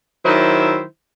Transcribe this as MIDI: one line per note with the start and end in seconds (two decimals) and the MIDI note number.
0.24 0.82 51
0.24 0.82 54
0.24 0.82 64
0.24 0.82 72
0.24 0.82 76